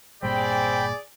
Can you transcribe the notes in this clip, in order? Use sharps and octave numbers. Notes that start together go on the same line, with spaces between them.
G1 A#2 G3 C4 G#4 D5 G5 B5